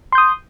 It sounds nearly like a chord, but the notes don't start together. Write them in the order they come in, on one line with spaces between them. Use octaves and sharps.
C6 G6 D#6